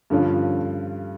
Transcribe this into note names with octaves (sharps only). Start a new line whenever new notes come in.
G2 D3 F3 C#4 F4